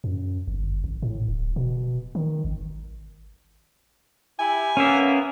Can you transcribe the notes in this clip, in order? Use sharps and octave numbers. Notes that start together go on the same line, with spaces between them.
F#2
G1
G#1
A2
D1
B2
D#3
G#1
E4 G4 G#5
A#3 B3 C#4 E5